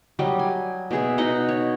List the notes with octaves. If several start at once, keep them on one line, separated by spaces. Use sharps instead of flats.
F#3 G3 D#5
G#5
B2 G#4 E5
B2 D#4 D#5 F#5
C#5